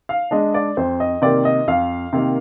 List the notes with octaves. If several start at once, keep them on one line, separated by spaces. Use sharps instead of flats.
F5
G#3 D4 D#5
D5
F2 C5
D#5
C3 D#3 A#3 D5
D#5
F2 F5
C3 D#3 A#3